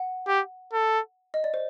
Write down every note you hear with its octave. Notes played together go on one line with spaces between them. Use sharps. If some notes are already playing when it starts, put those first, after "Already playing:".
Already playing: F#5
G4
A4
D#5
D5
C5